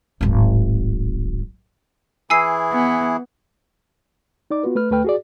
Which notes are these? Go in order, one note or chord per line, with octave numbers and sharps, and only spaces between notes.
D1 G#1
E3 E4 G#4 G#5 E6 C7
B3
D#4 D5 D6
B3 F4 F#4 B4
A3 B4 F6
D2 A3 B4 G5 F6
F#4 G#4 D5